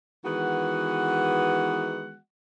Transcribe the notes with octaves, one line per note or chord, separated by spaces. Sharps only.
D#3 E3 G#3 B3 F#4 F#5